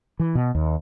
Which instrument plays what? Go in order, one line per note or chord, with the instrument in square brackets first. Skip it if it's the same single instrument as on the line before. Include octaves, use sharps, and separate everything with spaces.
[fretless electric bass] E3
B2
D#2